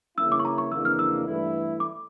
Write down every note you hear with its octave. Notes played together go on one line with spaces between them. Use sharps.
C#3 E3 A#3 C#4 E4 E6
D6
C#6
A#5
C#6
F2 C#3 E3 A#3 D4 E6
F6
E6
G2 E3 A3 E4
D6